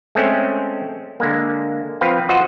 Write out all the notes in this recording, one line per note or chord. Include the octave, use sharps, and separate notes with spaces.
G#3 A3 C4 C#4
D3 G#3 A#3
F3 C4 B4 F5
F4 F#4 C5 D#5 F#5